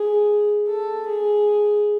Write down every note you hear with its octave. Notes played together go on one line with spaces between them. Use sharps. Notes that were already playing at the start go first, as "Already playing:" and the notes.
Already playing: G#4
A4
G#4